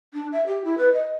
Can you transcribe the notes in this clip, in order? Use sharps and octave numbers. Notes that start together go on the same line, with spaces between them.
D4
E5
G4
E4
B4
D#5